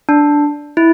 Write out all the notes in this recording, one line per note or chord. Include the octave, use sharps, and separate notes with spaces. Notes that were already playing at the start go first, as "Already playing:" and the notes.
D4
E4